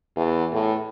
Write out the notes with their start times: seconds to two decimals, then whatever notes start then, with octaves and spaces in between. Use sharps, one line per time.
0.16 E2
0.53 A2